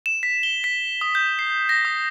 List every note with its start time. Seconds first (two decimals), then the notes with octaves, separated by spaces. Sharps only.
0.06 E7
0.23 B6
0.43 G7
0.64 B6
1.01 D#6
1.15 G6
1.39 C7
1.69 A#6
1.85 D#6